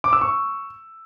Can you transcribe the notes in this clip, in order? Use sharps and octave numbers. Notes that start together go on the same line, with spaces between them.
D6
E6
C#6